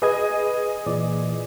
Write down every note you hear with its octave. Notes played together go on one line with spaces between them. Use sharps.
G#4 B4 D#5 D#6 G#6
A#2 E3 D5